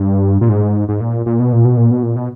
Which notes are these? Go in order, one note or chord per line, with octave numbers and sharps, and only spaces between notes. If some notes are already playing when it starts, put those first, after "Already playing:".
Already playing: G2
A#2
G#2
G#2
A#2
A#2
B2
A#2
B2
A#2
B2
A#2
B2